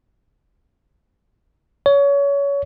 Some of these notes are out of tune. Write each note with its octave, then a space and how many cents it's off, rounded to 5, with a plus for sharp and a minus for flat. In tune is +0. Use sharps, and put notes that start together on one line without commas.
C#5 +25